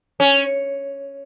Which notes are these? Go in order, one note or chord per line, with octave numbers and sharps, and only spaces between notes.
C#4